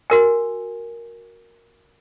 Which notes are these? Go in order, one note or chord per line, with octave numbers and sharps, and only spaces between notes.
F#4 A#4 G#5